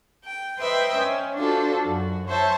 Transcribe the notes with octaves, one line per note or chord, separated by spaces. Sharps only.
G5
B4 C5 D#5 E5 G5
C#4
D4 F4 F#4 A4 C5
F#2 F#4
C5 C#5 E5 A5